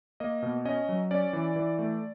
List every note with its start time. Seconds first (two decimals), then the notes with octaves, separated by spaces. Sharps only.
0.20 A#3 D#5
0.42 B2
0.65 C#4 D#5
0.89 F#3
1.11 C#4 D5
1.33 E3
1.56 E3
1.79 A3